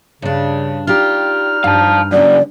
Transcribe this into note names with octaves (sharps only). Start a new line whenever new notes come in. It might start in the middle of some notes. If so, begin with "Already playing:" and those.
G2 C#3 D4
G3 D#4 F4 G4 F6
G2 F5 A5
F#2 C#3 D5